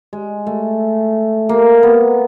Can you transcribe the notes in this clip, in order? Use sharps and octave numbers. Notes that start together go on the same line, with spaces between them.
G#3
A3
A#3
B3